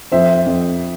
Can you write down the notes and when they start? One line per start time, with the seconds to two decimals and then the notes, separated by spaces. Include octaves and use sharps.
0.12 F2 C5 E5
0.46 F2